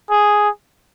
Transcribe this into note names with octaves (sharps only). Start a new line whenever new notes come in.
G#4